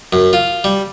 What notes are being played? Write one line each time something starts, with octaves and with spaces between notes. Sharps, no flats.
F#2
F4
G3